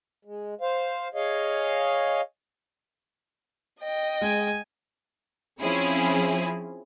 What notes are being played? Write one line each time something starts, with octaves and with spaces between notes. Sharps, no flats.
G#3
C5 F5
G#4 C#5 D#5 F5
D#5 G5
G#3 G#5
F3 C4 C#4 E4 G#4